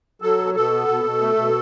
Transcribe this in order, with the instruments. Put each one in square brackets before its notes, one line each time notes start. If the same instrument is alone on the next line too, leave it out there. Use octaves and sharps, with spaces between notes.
[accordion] F#3 A4
B2
B2 A4
B3
B2
B2
A3
B2